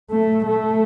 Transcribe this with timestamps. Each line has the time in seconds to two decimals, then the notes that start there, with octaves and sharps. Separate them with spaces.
0.11 A3
0.47 A3